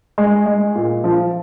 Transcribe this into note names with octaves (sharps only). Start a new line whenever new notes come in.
G#3
G#3
A#2
F3